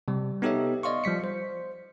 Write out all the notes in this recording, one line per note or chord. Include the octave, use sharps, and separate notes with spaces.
C3 G3
B3 D#4 G4 A4 C#5 E5
D5 D#5 F5 C6 C#6
F3 G3 B6 C#7
C5